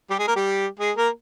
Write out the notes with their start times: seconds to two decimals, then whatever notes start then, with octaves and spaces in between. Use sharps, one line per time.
0.10 G3 G4
0.19 G#3 G#4
0.28 A#3 A#4
0.36 G3 G4
0.79 G#3 G#4
0.97 A#3 A#4